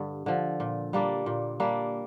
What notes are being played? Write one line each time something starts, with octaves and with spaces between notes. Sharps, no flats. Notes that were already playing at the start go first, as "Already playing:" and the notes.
Already playing: G2 D3
D3 F3
A#2
G3 A#3 D4
A#2
G3 A#3 D4